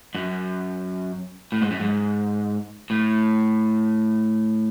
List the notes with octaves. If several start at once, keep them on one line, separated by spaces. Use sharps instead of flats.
F#2
A2
G#2
F#2
G#2
A2